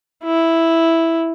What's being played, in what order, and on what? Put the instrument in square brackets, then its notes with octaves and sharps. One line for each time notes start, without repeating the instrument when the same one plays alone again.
[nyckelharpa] E4